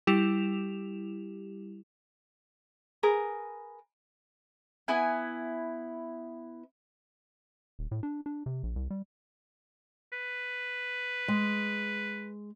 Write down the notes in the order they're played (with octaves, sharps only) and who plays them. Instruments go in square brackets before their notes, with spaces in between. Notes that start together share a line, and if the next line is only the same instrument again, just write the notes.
[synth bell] G3 E4 G4 E7 F7
[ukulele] G#4 A#4 B4
[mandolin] B3 E4 G#5
[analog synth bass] D#1
A2
D4
D4
C3
A#1
C2
G3
[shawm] B4
[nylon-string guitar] G#3